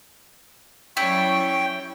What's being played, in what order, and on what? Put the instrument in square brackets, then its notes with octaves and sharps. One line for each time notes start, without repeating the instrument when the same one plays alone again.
[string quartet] F#3 G3 C#4 [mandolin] E4 [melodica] G5 [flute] C#6